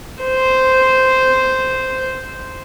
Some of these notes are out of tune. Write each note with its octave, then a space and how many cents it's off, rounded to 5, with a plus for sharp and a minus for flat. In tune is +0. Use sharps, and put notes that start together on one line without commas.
C5 -5